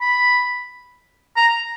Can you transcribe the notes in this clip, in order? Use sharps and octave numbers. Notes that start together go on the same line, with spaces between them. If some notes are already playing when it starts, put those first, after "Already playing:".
B5
A#5